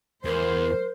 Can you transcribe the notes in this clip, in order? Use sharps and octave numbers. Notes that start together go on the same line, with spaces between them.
E2 A#4 C5